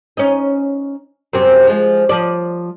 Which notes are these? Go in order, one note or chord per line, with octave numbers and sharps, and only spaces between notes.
C#4 D#4
F#2 C3 C4
F3 G#3
F3 D5